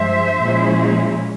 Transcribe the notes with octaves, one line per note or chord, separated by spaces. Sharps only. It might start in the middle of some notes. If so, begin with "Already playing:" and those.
Already playing: G2 F3 G#3 C5 E5
A#2 F3 G#3 C#4 E4